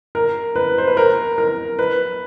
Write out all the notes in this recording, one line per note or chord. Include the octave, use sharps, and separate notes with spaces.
A#4
B4
C5
B4
A#4
A#4
B4